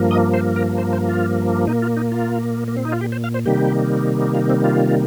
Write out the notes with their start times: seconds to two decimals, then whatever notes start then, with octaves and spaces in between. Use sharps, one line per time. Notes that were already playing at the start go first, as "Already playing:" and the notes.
Already playing: G2 F3 A#3
0.11 D#5
0.34 C5
0.56 A#4
0.78 C5
0.93 C5
1.08 F4
1.67 A#2 A#3 D#4
1.82 F4
1.97 D#4
2.12 F4
2.68 A#3
2.77 C4
2.85 D#4
2.92 F4
3.01 G4
3.12 C5
3.24 F5
3.34 C5
3.46 C3 D#3 G3 A#3 G4
4.34 F4
4.50 C4
4.64 F4